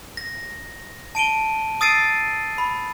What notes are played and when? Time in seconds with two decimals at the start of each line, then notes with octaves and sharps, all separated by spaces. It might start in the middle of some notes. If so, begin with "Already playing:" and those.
0.17 A#6
1.15 A5 D7 D#7 G7
1.81 D#6 E6 A6 C7 D7 D#7
2.58 B5